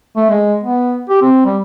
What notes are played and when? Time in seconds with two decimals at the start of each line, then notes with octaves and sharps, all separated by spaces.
0.17 A3
0.30 G#3
0.64 B3
1.10 G4
1.22 C4
1.46 G3